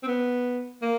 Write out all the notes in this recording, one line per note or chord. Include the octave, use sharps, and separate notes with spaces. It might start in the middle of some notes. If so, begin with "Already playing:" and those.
C4
B3
A#3